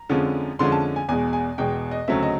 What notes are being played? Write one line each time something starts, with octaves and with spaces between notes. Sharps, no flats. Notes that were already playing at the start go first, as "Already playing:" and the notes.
Already playing: A#5
F2 D3 F3 G#3 C#4
F2 D3 F3 G#3 C#4 C6
A5
G#5
E2 B2 G#3 G#5
G#5
E2 B2 G#3 G5
D#5
D2 C#3 F#3 A3 C4 E5
D#5